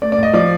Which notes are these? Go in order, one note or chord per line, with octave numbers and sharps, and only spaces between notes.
A3 D5
D5
A2 D#5
F3 D5